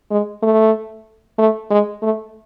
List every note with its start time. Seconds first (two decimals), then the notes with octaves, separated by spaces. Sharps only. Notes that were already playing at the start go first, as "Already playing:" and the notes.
0.11 G#3
0.43 A3
1.39 A3
1.71 G#3
2.02 A3